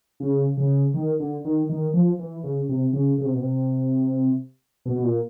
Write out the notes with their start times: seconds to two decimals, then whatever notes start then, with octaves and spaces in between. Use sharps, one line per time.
0.20 C#3
0.57 C#3
0.94 D#3
1.20 D3
1.45 D#3
1.69 D#3
1.94 F3
2.19 E3
2.44 C#3
2.69 C3
2.93 C#3
3.18 C#3
3.25 C3
3.33 B2
3.40 C3
4.85 B2
4.96 B2
5.04 A#2